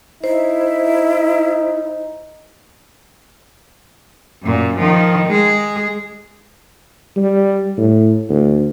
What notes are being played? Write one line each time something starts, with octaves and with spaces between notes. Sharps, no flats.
D#4 E4 C5
F#2 A#2
D#3 F3
G#3 G#4
G3
A2
D2